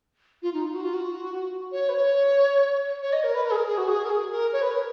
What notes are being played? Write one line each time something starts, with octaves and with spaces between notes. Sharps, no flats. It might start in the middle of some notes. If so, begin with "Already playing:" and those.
F4
D#4
F4
F#4
F4
F#4
C#5
B4
C#5
C#5
D#5
A#4
B4
A#4
G#4
A#4
G#4
F#4
G#4
A#4
G#4
A#4
C#5
B4
A#4